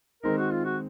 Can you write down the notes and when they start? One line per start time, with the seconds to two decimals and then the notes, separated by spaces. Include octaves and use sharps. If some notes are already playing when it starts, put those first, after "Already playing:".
0.23 D#3 G#3 C4 D#4 A#4
0.38 F#4
0.51 F4
0.65 F#4